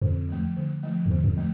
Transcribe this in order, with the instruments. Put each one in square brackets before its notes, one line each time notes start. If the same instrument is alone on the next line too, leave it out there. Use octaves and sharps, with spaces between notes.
[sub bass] F2 [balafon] D3
[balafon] F3 A3
D3
F3 A3
[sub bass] F2
[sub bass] E2 [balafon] D3
[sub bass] F#2
F2
[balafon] F3 A3